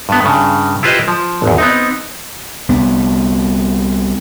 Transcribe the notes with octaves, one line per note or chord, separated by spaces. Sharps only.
G2 B3
G2 C#3
E4 F4 G4 B4 C5 D#5
F3
G#1 E2
B3 C4 D#4
C2 B3